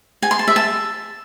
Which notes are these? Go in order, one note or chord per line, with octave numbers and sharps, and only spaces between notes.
G#5
C6
A5
E5
A5